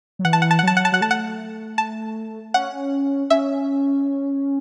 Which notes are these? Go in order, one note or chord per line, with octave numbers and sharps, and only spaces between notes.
F#3
E3 F#5
A5
F#5
A5
F#5
F#3 A5
F#5
A5
F#3 F#5
A3 A5
F#5
A5
C#4 F#5
C#4 E5